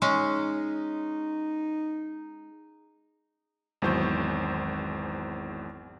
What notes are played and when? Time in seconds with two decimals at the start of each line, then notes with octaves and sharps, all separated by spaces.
0.02 G#3 C#4 D#4
3.82 G#1 E2 F#3 C5 C#6 G6